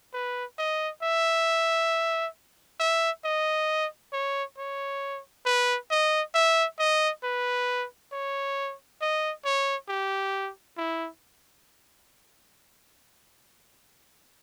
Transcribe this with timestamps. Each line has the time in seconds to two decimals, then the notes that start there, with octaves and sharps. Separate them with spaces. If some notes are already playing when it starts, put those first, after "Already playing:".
0.14 B4
0.58 D#5
1.03 E5
2.80 E5
3.24 D#5
4.13 C#5
4.58 C#5
5.46 B4
5.91 D#5
6.34 E5
6.79 D#5
7.23 B4
8.12 C#5
9.01 D#5
9.45 C#5
9.88 G4
10.77 E4